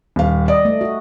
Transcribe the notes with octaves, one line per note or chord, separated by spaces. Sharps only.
D#1 F5
D5 D#5
A3
F#4